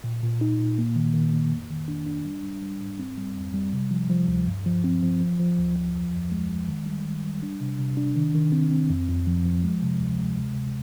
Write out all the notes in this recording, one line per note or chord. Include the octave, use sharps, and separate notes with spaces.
A#2
A#2
D#4
A#2
A#3
D#3
D#3
A#3
F2
D#3
D4
D4
G3
G3
G3
G#2
C4
G3
F2
G3
C3
F3
F3
D2
G2
F3
C4
F3
F3
F3
D2
F3
F2
F2
G#3
G#3
D#3
G3
D#3
G3
D4
C3
C3
D4
D#3
D#3
C4
C4
F2
F2
F3
F3
G#3
C3
D2
G#3
C3
C3